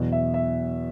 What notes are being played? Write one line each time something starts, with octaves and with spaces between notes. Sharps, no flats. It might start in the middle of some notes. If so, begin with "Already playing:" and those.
Already playing: E2 B2 F#3
E5
E5